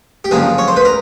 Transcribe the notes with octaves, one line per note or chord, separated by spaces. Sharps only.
G4
F#2 D3 F3 A#3 G#4
C#5
C5
B4
A#4